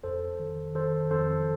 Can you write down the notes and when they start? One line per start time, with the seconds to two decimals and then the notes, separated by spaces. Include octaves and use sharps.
0.04 F2 A4 C5
0.40 D#3
0.75 D#3 A4 C5
1.11 F2 A4 C5